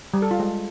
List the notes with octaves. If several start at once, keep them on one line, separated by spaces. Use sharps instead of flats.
G3
A4
F4
G#3